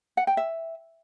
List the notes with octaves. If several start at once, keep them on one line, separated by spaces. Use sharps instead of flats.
F#5
G5
E5